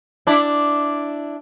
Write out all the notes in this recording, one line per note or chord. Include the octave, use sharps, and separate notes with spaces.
D4 E4